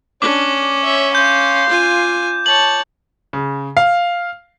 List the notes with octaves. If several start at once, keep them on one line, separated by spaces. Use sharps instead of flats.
C#4 D4 D6
C#5 E5
F5 C6 G6
F4 G#5
C#5 A5 F#7
C#3
F5